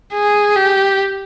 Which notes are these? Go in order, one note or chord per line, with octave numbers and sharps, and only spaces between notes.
G#4
G4